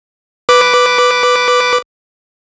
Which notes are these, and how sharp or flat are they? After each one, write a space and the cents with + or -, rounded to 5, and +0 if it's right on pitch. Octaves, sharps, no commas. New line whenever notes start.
B4 +0 D6 +0